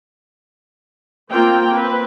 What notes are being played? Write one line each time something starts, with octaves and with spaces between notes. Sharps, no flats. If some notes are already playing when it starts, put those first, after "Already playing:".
A#3 C4 F4 G5
C4 B4